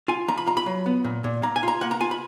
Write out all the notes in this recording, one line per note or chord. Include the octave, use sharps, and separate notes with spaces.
F4 G#5
F3 A#5
B5
F4 A#5
B5
F#3
B3
A#2
A#2
A#3 A#5
G#5
F4 A#5
A#3 F#5
A#5
F4 G#5
B5